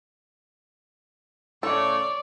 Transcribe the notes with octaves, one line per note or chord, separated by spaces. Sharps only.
A2 C#3 A3 A4 C#5 D5